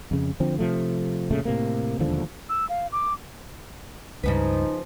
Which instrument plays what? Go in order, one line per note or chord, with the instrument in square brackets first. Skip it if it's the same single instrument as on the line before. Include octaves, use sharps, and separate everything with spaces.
[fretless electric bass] F2 C#3
D3 F3 C4
C3 F3 A3
F1 A#2 C#3 A3
A2 C3 A#3
E1 D#2 D3 F3
[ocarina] E6
F5
D6
[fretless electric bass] C#2 G2 [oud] C#3 F3 B4 [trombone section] D#4